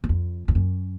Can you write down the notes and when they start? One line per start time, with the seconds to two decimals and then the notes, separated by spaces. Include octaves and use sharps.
0.04 E2
0.09 F2
0.48 F2
0.55 F#2